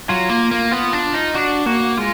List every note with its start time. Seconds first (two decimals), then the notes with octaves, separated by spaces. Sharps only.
0.09 F#3 F4
0.29 A#3
0.51 A#3
0.71 B3 F4
0.93 D4
1.14 D#4
1.35 D4 F#4
1.66 A#3 F#4
1.98 G#3 F4